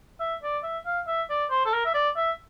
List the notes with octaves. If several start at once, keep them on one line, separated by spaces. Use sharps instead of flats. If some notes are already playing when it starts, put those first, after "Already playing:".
E5
D5
E5
F5
E5
D5
C5
A4
A#4
E5
D5
E5